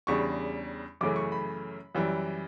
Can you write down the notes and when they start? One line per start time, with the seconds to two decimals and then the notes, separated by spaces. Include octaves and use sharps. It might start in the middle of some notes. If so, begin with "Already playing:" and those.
0.07 E2 C#3 G3 D4 C#6
1.01 F#2 C#3 E3 A3 C#4 D6
1.16 C#6
1.32 B5
1.95 F#2 E3 G3